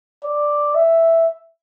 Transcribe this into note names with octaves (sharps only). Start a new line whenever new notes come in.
D5
E5